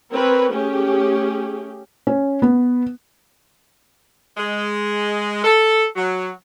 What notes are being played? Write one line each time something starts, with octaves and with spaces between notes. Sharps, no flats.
C4 A#4 B4 C#5
A3 C#4 G4 G#4
C#4
B3
G#3
A4
F#3